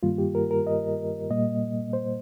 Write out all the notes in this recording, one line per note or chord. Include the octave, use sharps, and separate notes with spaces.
G2 D#3 G3 A#3 F4
G4
A#4
A#4
D#5
A#2 G3 A#3 D#5
C5